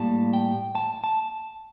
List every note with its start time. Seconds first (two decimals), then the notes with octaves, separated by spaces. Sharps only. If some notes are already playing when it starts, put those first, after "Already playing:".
Already playing: A2 G3 A#3 A5
0.33 G5
0.75 A5
1.04 A5